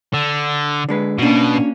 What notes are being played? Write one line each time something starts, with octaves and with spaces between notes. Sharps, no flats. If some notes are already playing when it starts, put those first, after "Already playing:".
D3
D3 G#3 B4
B2 A#3 C#4 D4 F#4